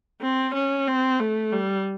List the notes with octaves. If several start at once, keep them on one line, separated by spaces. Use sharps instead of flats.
C4
C#4
C4
A3
G3